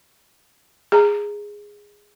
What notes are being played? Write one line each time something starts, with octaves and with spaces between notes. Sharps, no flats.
G#4 A#5